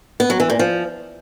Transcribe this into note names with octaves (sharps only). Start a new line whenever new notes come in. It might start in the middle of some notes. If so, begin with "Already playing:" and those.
B3
F#3
E3
A#2
F3